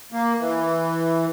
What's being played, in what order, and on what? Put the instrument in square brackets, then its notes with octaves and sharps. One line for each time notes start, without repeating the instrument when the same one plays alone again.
[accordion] A#3
E3